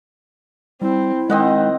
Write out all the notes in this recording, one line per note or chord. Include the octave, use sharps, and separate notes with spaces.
G3 C4 E4
D#3 G#3 C4 D#5 F#5